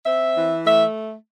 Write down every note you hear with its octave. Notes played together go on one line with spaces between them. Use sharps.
C4 E5
E3
A3 E5